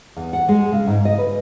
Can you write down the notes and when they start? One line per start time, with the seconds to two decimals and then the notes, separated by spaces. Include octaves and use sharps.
0.16 E2
0.33 F#5
0.48 G#3
0.72 C#3
0.87 G#2
1.05 D#5
1.18 B4